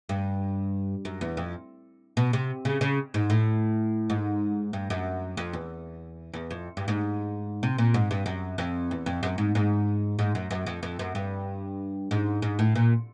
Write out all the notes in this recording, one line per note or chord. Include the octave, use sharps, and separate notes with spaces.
G2
F#2
E2
F2
B2
C3
C#3
C#3
G#2
A2
G#2
G2
F#2
F2
E2
E2
F2
G2
G#2
C3
A#2
G#2
G2
F#2
F2
E2
F2
F#2
G#2
G#2
G#2
F#2
F#2
F2
F2
F#2
G2
G#2
G#2
A2
A#2